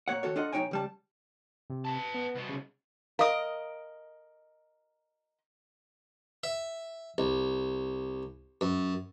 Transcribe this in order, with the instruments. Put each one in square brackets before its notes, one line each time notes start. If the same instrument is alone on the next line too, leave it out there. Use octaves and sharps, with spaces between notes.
[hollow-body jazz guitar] A2 A#3 C#5 F#5
D#2 F#4 A4 C#5
D4 F4 A4 D#5 F#5
B1 A3 D#4 C#5 G5 G#5
C#2 G3 A5
[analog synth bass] C3
[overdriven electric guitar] B4 A5
[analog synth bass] B3
[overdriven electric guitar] C2 B2
[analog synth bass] C#3
[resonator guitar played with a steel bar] A#4 D#5 [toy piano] F5 D#6
[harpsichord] E5
C2
F#2